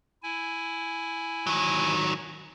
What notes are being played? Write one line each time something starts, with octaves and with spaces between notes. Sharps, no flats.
E4 G#5
D#3 F#3